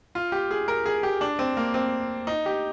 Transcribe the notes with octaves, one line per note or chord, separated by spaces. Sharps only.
F4
G4
G#4
A#4
G#4
G4
D4
C4
A#3
C4
D#4
G4